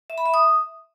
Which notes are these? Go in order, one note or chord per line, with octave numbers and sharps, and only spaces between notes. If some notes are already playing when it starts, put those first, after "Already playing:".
E5
B5
E5
D#6